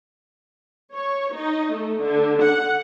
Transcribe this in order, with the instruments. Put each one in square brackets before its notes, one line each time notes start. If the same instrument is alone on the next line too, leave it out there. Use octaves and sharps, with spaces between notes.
[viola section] C#5
D#4
A3
D3
F#5